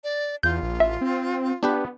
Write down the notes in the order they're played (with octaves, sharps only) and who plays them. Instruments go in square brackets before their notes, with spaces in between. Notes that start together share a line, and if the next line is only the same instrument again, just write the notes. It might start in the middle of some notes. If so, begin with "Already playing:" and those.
[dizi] D5
[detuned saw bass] E2 [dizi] F4 [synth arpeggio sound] G6
[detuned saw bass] A#1
[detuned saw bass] A1 [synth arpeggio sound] E5
[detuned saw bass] C4
[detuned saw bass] B3 [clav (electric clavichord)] D4 G4 B4